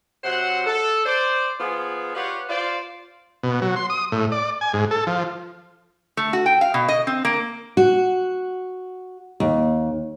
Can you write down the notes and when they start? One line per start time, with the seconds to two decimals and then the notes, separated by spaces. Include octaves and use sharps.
0.24 C3 F#3 C5 F#5
0.66 A4
1.05 C5 D5
1.60 F3 B3 F4 G#4
2.15 F4 G4 B4 C#5 D5 F#5
2.48 F4 C5 D5
3.43 B2
3.62 F#3
3.76 C6
3.90 D#6
4.12 A2
4.32 D5
4.61 G#5
4.73 G#2
4.91 A4
5.07 F3
6.17 A3
6.33 F#4
6.46 G5
6.61 F5
6.74 B2
6.89 D#5
7.07 C4
7.25 A#3
7.77 F#4
9.40 D#2